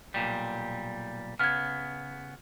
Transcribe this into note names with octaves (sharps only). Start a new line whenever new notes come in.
B1 A#2 G3
C#3 B3 F6 G#6